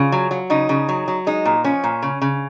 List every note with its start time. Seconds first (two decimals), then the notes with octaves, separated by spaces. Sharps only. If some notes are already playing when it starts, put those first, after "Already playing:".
Already playing: C#3 F4
0.12 F#3
0.31 F#3
0.50 C#3 D#4
0.69 C#3
0.89 F#3
1.08 F#3
1.27 G#3 D#4
1.45 A#2
1.64 F3 C#4
1.84 A#2
2.02 C#3
2.21 C#3